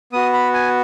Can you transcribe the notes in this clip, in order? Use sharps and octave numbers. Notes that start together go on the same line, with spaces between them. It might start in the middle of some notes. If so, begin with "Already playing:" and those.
B3 F#4 D#6
B5
G#5